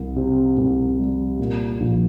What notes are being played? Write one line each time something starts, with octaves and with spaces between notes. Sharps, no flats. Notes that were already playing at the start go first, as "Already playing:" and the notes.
Already playing: C2
C3
C2
G3
A#2
A#1